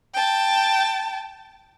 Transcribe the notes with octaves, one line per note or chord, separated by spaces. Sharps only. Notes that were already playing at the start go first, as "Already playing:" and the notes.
G5 A5